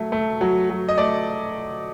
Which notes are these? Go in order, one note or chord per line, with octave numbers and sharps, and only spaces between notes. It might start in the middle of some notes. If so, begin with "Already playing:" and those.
Already playing: F#3 A3
A3
F#3
F#3
D#5
A3 D5